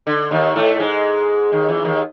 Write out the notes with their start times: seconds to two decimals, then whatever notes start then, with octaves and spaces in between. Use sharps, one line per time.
0.07 D3
0.31 D#2 D#3
0.55 A2 A3
0.80 G#2 G#3
1.52 D#2 D#3
1.69 E2 E3
1.85 D#2 D#3